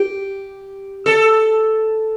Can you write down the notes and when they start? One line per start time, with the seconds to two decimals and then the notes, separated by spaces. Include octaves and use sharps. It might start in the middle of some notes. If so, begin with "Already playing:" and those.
Already playing: G4
1.06 A4